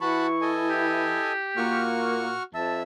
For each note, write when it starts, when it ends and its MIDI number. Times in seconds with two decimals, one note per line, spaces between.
0.01 1.16 52
0.01 1.41 64
0.01 0.27 66
0.01 0.27 81
0.01 0.27 83
0.01 0.51 85
0.41 1.32 69
0.41 1.32 75
0.41 1.32 80
0.69 1.86 67
1.57 2.34 46
1.57 2.38 58
1.57 2.43 66
1.57 2.43 85
1.57 2.43 89
2.54 2.83 41
2.54 2.83 76
2.54 2.78 81